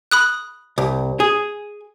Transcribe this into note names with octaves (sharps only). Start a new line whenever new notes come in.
B5 D#6 F#6
C2
G#4